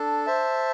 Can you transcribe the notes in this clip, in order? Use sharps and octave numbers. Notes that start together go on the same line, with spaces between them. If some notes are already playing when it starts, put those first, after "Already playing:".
Already playing: D4 A4
C5 E5 A5